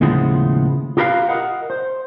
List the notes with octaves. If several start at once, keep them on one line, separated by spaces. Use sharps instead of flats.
D#2 A2 C#3 F3 G#3 B3
F4 G4 A#4 B4 E5 F5
A#4 D#5 F#5
C5